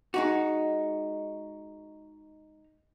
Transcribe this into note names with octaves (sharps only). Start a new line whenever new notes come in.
G#3 D#4 F#4